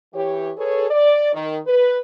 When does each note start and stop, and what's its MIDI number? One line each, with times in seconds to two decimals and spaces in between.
0.14 0.52 52
0.14 0.52 67
0.14 0.52 73
0.58 0.86 68
0.58 0.86 69
0.58 0.86 71
0.58 0.86 73
0.91 1.33 74
1.34 1.59 51
1.67 1.98 71